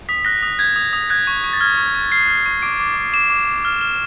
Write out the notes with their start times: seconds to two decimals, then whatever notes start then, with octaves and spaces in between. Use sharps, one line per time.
0.09 D#6 B6
0.25 F#6 A#6
0.43 D#6
0.59 G6 G#6
0.76 D#6
0.93 D#6
1.10 F#6 G#6
1.27 C#6
1.44 C#6
1.53 A6
1.60 F6 G#6
1.77 C#6
1.95 C#6
2.12 F6 C7
2.29 F6
2.46 C#6
2.62 D6 D7
2.80 D6
2.97 D6
3.13 D6 E7
3.30 D6
3.47 D6
3.65 F6
3.81 F6